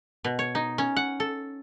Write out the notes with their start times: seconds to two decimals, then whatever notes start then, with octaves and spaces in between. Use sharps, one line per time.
0.24 B2
0.39 C#5
0.55 D#4
0.78 C#4
0.96 F#5
1.20 A4